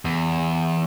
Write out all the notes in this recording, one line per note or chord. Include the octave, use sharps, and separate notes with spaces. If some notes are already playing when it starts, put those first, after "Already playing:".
E2